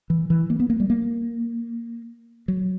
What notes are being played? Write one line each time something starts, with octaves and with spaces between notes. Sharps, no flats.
E3
E3
A#3
B3
A#3
G3
A#3
F#3